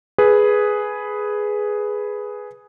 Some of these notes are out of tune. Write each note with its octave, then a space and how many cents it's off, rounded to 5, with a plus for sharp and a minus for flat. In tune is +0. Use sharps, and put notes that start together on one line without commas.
G#4 +5 B4 +0